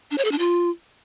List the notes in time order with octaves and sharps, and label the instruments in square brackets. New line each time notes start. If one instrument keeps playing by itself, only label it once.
[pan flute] D4
C#5
A4
D4
F4